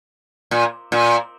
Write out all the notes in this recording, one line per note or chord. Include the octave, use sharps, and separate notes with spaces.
A#2
A#2